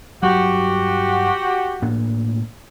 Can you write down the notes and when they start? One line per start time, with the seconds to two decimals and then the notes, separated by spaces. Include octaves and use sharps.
0.23 G2 F#3 F#4 G4
1.82 A2 A#3 D4